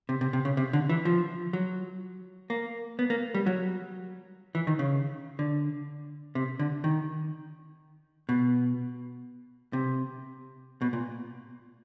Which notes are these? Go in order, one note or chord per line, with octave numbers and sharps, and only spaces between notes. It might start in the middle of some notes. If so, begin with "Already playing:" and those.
C3
C3
C3
C#3
C3
D3
E3
F3
F#3
A#3
B3
A#3
G3
F#3
E3
D#3
C#3
D3
C3
D3
D#3
B2
C3
B2
A#2